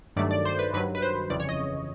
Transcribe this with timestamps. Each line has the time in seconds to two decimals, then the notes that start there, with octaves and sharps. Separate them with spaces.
0.16 G2 D#3 F#3 A3 D5
0.31 D5
0.45 C5
0.59 B4
0.73 G2 D#3 F#3 B4
0.95 B4
1.02 C5
1.30 G1 F2 C#3 E3 D5
1.40 C#5
1.49 D#5